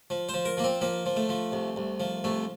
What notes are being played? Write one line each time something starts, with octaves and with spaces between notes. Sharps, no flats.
F3
C5
F3
A#4
F3 A#3
C4
F3 A#3
F3
A3
F3
C2
C2
F3
C2 A3